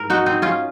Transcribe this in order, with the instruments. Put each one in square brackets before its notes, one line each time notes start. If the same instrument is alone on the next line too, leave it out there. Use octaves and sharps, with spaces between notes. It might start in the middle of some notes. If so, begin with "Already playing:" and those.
Already playing: [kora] G#2 A#4
D#4 F#4
C4 D#4
C#4 F4